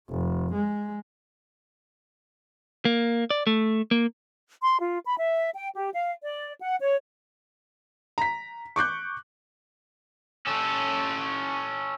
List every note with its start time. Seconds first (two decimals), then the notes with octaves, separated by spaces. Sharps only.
0.10 F1
0.54 G#3
2.85 A#3
3.30 D5
3.47 A3
3.91 A#3
4.62 C6
4.79 F4
5.05 B5
5.18 E5
5.54 G5
5.75 G4
5.93 F5
6.22 D5
6.61 F#5
6.80 C#5
8.18 A#5 B6
8.76 C#6 D6 F#6 G6
10.47 C#4 A4